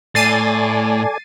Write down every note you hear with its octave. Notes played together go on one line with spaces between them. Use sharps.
A2 A4 D5 G#5 A6 C7 D#7